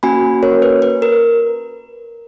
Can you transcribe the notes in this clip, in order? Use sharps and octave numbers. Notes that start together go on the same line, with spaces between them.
A#3 C#4 F#4 G#5 B5
A#4 C#5
B4
B4
A#4